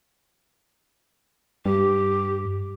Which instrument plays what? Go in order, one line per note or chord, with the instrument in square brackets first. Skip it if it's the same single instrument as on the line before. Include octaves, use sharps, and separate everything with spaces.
[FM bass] G2 [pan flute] G4